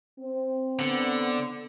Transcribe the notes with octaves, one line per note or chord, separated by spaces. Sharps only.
C4
D3 B3